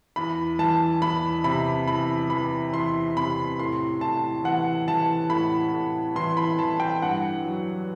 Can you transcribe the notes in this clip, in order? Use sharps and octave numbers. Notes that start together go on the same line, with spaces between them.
E2 B5
E3 A5
E2 B5
C3 B5
E2 B5
E3 B5
E2 C6
C3 B5
A2 C6
A2 A5
E3 F#5
E3 A5
A2 B5
A2
E3 C6
B5
E3 A5
G5
G2 F#5
F#3